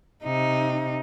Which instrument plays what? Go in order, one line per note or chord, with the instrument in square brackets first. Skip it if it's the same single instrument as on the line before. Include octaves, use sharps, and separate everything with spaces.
[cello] C3 D#4